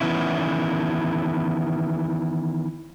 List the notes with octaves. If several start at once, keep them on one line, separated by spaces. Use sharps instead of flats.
D#3 E3 B3 C#4 E4